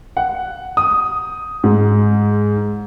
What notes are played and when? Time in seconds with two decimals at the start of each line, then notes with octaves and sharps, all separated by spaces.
0.17 F#5
0.77 D#6
1.64 G#2